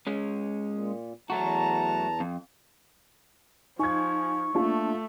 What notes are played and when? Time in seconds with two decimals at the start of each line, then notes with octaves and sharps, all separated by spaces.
0.07 G#3 C#4
0.69 A#2
1.30 E2 F#3 A3 F#4 A5 A#5
2.20 F2
3.79 F3 D#4 G#5 C#6 G#6
4.55 A3 A#3 D4 F4 A5